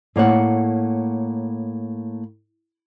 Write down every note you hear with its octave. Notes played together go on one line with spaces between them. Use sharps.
A2 A#3 C#5 F#5